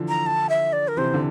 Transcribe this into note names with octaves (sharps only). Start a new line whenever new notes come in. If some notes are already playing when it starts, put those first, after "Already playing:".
Already playing: D3 E3 F3
A#5
A5
E5
D5
A#4
C3 E3 C5
D3